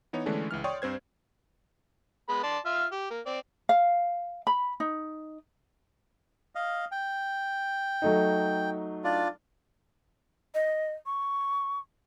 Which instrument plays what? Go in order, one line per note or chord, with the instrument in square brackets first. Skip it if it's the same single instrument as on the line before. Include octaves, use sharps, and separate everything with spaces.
[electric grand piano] E3 B3 D#4 C#5
D3 E3 G#3 A3 C#4 D4
C#2 E3 F6
C#5 D5 G5 C6 C#6 D#6
G2 C4 C5 G#6
[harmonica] G#3 B3 B5
D5 A5 C6
F4 E5 F6
G4
A#3
C4 D5
[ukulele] F5
B5
D#4
[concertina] D#5 F5
G5
[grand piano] F#3 A3 D#4
[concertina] D4 F4 D5
[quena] D#5
C#6